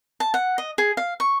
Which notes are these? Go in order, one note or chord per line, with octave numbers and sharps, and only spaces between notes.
A5
F#5
D#5
G#4
F5
C#6